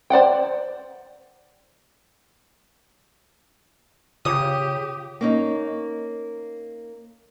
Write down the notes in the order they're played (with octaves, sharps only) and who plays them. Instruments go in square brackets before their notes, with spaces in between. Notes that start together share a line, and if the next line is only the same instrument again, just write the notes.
[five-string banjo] C5 D5 F#5 G5
[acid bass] C#3 [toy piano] F4 C#5 D6 [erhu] G4 [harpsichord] D#6
[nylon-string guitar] A#3 C#4 D#4